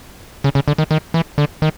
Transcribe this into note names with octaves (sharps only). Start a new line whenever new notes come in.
C#3
C#3
D3
D#3
D#3
E3
D3
D#3